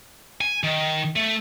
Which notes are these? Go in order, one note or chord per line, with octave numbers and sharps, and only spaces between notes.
G#5
D#3
A3